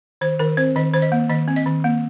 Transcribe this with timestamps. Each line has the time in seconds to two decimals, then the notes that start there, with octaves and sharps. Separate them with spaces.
0.21 D#3 C5
0.39 D#3 A#4
0.57 C4 C5
0.75 D#3 D#5
0.94 D#3 C5
1.02 D#5
1.12 A#3
1.30 D#3 D#5
1.48 C4
1.56 D#5
1.66 D#3
1.84 A#3